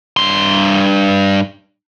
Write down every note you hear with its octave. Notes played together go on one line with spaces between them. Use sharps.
G2 C6